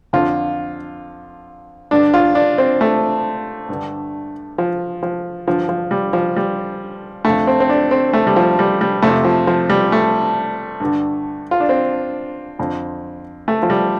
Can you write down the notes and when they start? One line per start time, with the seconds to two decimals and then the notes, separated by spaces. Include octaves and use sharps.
0.13 F2 D3 F4
1.91 G2 D3 D4
2.14 F4
2.35 D4
2.58 C4
2.81 A3
3.69 G2 D3
4.58 F3
5.03 F3
5.47 G2 D3 F3
5.69 F3
5.91 G3
6.13 F3
6.36 G3
7.25 F2 D3 A3
7.47 C4
7.60 C4
7.69 D4
7.91 C4
8.13 A3
8.27 G3
8.36 F3
8.59 G3
8.81 G3
9.02 F2 C3 A3
9.24 F3
9.47 F3
9.70 G3
9.92 A3
10.80 G2 D3
11.51 F4
11.60 D4
11.69 C4
12.59 F2 D3
13.48 A3
13.63 F3
13.70 G3